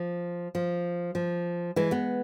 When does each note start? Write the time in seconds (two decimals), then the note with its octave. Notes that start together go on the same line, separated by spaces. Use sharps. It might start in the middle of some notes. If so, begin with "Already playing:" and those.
Already playing: F3
0.55 F3
1.15 F3
1.76 E3 G#3
1.91 G#3 B3